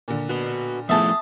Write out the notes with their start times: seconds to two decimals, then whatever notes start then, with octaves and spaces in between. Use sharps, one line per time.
0.08 A#2 D3
0.29 F#4 B4
0.89 F3 A3 B3 E4 G#4 E5 A5 D#6